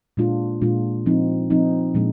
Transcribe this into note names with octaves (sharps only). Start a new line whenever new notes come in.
A#2 G#3 D4 F4
A#2 G#3 D4 F4
F3 C4 D#4
F3 C4 D#4
A#2 F3 G#3 D4